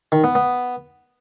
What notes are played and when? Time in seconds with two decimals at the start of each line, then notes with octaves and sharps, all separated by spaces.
0.12 D#3
0.24 B3
0.35 B3